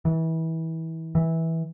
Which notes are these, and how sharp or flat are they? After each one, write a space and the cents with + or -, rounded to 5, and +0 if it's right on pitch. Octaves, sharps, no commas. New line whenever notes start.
E3 -30
E3 -15